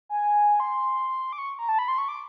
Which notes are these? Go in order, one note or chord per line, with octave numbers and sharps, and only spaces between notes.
G#5
C6
D6
C#6
A#5
A5
B5
C6
C#6
D6